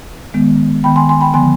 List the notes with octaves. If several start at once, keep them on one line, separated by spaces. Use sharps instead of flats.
D#3 G#3 B3
D#3 B3 G5 B5
G#5 C6
G#5 C6
G5 B5
D3 F3 B3 G#5 C6